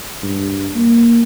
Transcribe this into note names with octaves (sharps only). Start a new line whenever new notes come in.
G2
A#3